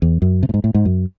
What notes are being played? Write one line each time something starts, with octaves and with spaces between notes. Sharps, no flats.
E2
F#2
C3
A2
G#2
A2
G#2
F#2